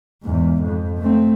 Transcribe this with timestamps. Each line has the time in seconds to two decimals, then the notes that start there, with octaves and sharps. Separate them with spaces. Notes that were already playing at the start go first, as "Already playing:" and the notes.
0.23 E2 G#2
0.63 F2
0.98 A3 C4